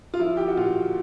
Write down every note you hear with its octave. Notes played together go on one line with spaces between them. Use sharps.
F4
F3 E4
G4
F#4
A#2 F4